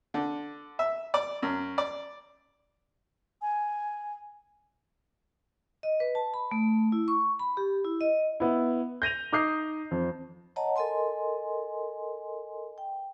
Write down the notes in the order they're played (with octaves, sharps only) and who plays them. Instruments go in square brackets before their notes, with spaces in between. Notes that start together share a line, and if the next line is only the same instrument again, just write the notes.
[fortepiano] D3
E5
D5
F#2
D5
[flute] G#5
[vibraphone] D#5
B4
A5
B5
A3
E4
C#6
B5
G4
E4
D#5
[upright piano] B3 E4
G6 A#6 D#7 F7
D#4 D6 D#6 G6 C7
F2
[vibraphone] C#5 D#5 F#5 A5 A#5
A4 A#4 D#5 G#5 C6
G5